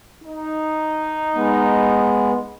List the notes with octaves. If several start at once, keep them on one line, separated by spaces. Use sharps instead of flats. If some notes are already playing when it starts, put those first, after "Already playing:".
D#4
G#3 B3